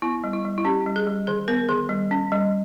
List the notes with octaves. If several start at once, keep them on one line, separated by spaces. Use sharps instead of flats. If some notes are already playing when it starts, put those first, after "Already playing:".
B3 E4
G3
E4
G3
E4
C#4 G4
G3
G#4
G3
D#3 G#4
B3 A#4
D#3 G#4
G3
C#4
G3